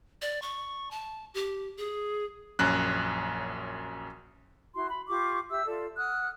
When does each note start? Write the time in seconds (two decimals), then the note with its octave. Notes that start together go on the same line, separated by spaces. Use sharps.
0.22 D5
0.42 C#6
0.91 A5
1.34 G4
1.78 G#4
2.59 A#1 F#2 C#4 F#6
4.75 E4 F#4 C6
4.90 B5
5.08 F4 G4 C#6 D6
5.49 G4 E5 E6
5.67 F4 A4 D5
5.97 F#5 D#6 F6 F#6